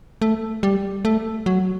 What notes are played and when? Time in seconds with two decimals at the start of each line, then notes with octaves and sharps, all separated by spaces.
0.22 A3
0.63 G3
1.05 A3
1.46 F#3